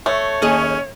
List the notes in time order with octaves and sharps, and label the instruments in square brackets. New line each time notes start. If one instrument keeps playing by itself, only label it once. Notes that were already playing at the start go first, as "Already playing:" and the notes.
[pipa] A3 [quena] C#5
[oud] D#2 G#4 D#5 [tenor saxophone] C#4